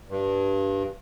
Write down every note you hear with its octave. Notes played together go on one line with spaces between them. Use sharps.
G2